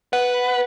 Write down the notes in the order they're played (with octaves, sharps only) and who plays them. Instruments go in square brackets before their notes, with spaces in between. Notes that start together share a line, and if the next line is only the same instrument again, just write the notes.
[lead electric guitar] B4 [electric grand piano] F#5